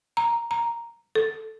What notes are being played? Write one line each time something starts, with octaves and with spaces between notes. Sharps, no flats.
A#5
A#5
A4